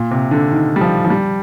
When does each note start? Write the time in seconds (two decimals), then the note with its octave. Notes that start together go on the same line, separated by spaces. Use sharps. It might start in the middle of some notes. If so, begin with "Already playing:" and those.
Already playing: A#2
0.11 C3
0.31 D3
0.51 D#3
0.76 G3
0.81 F3
1.05 F3
1.10 G3